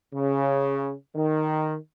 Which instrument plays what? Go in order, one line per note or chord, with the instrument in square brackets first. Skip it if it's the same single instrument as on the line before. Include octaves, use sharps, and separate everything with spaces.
[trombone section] C#3
D#3